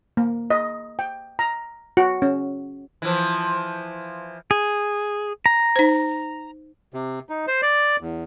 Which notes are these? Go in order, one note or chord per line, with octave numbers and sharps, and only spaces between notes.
A#3
D#5
G5
A#5
F#4
C#4
E3 F3
G#4
A#5
D#4 C5
C3
D#4
C5
D5
E2